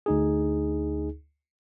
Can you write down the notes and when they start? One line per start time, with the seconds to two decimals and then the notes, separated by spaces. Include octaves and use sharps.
0.06 D2 D#4 G#4